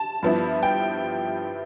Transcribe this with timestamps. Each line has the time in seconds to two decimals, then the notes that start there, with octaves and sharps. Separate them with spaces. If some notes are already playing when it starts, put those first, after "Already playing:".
Already playing: A5
0.23 G2 F3 B3 E4
0.63 G5